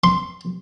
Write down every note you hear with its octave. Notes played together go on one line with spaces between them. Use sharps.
C6